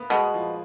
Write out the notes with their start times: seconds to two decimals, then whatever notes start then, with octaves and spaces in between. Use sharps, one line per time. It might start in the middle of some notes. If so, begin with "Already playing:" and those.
Already playing: A#3 B3
0.10 B2 G#3
0.34 F3